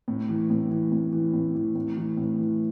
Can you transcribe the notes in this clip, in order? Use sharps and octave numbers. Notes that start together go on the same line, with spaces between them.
A2
E3
A2
E3
A2
E3
A2
E3
A2
E3
A2
E3